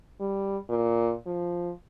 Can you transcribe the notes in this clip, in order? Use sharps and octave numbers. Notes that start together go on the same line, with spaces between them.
G3
A#2
F3